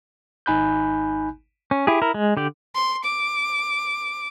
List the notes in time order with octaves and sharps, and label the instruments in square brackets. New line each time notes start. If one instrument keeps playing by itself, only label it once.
[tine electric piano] G#1 D#4 G#5 B5 F#6 G6
[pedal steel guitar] C#4
E4 G4 G#4
E4 A#4
G#3
D3 G4 D5
[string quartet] C6
D6